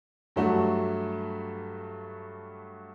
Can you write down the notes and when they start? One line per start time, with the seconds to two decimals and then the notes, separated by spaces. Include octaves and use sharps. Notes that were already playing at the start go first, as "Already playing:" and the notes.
0.36 G2 F#3 A3 D4 F#4